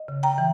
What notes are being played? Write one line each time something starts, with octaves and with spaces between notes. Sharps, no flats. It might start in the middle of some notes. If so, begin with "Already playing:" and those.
Already playing: D#5
C#3
G5 A#5
E3